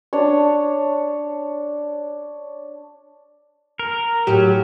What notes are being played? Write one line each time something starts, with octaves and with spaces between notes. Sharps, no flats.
D4 C#5
A#4
A2 F#3 G4 G#4